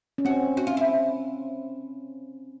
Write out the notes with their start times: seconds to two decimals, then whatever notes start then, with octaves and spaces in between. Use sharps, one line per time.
0.18 C#4
0.25 C4 F#4
0.57 F#4
0.67 F4
0.77 E4